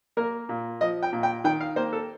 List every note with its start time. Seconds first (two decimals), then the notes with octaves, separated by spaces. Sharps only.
0.17 A#3 A#4
0.49 A#2
0.81 F3 D#5
1.02 G5
1.13 A#2
1.23 G5
1.44 D#3 G5
1.61 F5
1.76 A#3 C5
1.93 A4